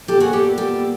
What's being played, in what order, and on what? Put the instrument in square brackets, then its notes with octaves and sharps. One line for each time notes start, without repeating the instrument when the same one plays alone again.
[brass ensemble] A#2 G3 B3 [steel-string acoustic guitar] G4 A4
[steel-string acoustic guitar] F#4 G#4
G4 A4
G4 A4